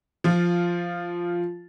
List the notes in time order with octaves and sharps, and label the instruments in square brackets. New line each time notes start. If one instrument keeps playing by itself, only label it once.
[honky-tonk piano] F3 F4